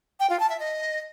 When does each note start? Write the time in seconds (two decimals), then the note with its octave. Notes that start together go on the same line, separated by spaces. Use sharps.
0.20 G5
0.30 F4
0.40 A5
0.50 E5
0.60 D#5